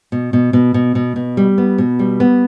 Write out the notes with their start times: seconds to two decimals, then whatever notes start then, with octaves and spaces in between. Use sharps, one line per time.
0.12 B2
0.33 B2
0.53 B2
0.74 B2
0.95 B2
1.16 B2
1.37 G3
1.58 B3
1.78 B2
1.99 G3
2.20 B3